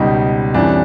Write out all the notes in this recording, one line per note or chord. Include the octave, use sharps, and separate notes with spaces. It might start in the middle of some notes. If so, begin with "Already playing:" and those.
Already playing: C#2 B2 G3 D#4
F2 C#3 E3 G3 D4